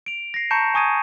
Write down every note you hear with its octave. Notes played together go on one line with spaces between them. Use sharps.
D7 F7
A#6 C7
A5 A#5 C#6 G6 C#7 E7
G#5 C#6 D#6 G#6 D#7